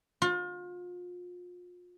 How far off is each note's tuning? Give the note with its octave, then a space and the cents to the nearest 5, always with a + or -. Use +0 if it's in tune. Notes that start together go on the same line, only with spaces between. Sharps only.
F4 +35